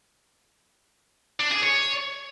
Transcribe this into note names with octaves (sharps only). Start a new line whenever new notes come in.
D4
G#4
C#5